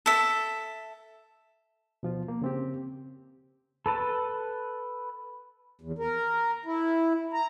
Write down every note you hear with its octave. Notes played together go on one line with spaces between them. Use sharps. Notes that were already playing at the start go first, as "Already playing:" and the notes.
A4 E5
B2 F3 F4
A#3
C#3 C4 G4
A4 B4 A5
E2
A#4
E4
A#5